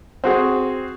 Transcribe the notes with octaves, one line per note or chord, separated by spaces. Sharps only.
C4 F#4 G#4